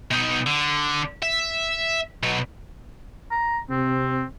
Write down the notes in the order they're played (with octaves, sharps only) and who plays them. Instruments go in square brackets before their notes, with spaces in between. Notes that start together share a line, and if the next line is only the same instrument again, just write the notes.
[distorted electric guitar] B2 D#4
D3
E5
B2 F#3
[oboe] A#5
[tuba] C3 [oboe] C4